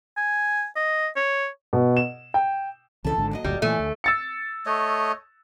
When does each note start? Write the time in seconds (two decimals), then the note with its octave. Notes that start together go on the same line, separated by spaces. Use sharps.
0.17 G#5
0.76 D#5
1.16 C#5
1.73 B2
1.97 E7
2.34 G5
3.04 C2 C#3 E3 F3 A4 A5
3.16 G#1 G#2 D3
3.31 D#2 F#3 D#5
3.44 F#1 D2 A#2 G3
3.62 F#2 A#2 E3 A3 G#5
3.80 D2
4.04 E6 A6 C#7
4.66 A3 C#5 D#5